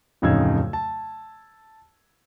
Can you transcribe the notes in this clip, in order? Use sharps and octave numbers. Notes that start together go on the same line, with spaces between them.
D1 F2 C#3 D#4 E6 G#6
A5